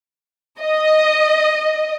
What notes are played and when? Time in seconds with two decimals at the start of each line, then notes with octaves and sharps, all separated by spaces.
0.60 D#5